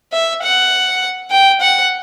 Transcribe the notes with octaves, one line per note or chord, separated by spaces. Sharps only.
E5
F#5
G5
F#5